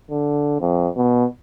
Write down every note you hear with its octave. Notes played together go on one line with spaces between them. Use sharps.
D3
F2
B2